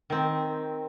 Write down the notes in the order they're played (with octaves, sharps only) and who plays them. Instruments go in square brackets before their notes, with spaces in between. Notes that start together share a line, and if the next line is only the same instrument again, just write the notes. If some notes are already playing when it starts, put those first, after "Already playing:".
[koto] D#3 C4